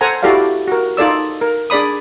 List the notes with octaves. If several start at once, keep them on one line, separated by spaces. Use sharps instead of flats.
A4 C5 F#5 G#5 A#5
E4 F#4 G4 A4 D5 F5
F#4 A#4
D#4 F4 A4 D5 E6
A#4
D4 G#4 D5 B5 D#6